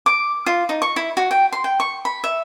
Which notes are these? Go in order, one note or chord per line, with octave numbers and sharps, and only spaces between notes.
D6
F4
D#4
C#6
E4
F#4
G5
C6
G5
C#6
B5
E5